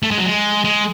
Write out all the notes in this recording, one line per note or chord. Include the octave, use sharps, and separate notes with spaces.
A3
G#3
F#3
G#3
G#3